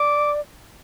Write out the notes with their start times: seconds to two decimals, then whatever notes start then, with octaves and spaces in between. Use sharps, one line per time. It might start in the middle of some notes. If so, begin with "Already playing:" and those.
Already playing: D5 D6